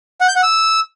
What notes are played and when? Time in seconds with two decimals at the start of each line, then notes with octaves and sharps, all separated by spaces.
0.21 F#5
0.28 G6
0.36 F#5
0.43 E6